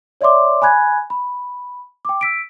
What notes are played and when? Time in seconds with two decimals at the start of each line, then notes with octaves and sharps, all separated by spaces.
0.21 C#5 D5 E5 C6 D6
0.62 G#5 B5 F#6 G#6
1.10 B5
2.05 G5 D6
2.21 E6 B6 D7